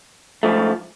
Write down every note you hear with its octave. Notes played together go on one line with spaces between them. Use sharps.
G#2 F3 A3